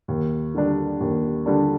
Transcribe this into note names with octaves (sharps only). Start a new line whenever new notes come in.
D#2
D3 G3 D4
D#2
D3 G3 D4